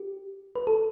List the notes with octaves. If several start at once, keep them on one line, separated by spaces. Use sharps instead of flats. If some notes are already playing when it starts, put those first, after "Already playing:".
Already playing: G4
B4
A4